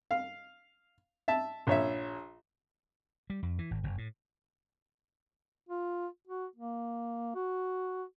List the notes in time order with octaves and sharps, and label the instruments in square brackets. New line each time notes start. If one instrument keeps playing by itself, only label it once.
[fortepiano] F5
E5 A5
A#1 C#5 E5
[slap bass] G3
F2
E3
G#1
F#1
A2
[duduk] F4
F#4
A#3
F#4